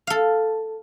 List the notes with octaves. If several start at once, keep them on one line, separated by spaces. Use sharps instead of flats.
A4 F5